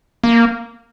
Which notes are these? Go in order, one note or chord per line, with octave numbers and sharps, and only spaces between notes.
A#3